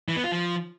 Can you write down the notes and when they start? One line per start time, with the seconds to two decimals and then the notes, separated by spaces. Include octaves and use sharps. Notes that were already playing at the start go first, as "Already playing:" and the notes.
0.08 E3
0.16 B3
0.24 F4
0.32 F3